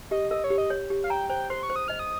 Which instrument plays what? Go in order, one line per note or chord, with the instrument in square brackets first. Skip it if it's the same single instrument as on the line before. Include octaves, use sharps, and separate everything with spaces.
[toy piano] G4 [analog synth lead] D#5
[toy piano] A#4 [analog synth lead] D#5
[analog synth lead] C#5
[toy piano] G4
[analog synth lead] D#5
[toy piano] C#5
G4
[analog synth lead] F5
[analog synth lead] G5 [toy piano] A#5
[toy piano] C5 [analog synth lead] G5
[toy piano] C5 [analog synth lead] C6
[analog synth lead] C#6
[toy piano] C5
[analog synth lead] D#6
[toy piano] D#5 [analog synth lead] F6
[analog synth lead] D#6